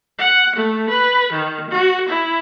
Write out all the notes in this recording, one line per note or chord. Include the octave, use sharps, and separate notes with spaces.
F#5
A3
B4
D#3
F#4
E4